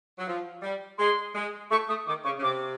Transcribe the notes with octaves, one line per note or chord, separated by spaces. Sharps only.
F#3
F3
G3
G#3 C6
G#3
A3 C#6
A3 D#6
D#3 D6
C#3 C#6
C#3
C3 D6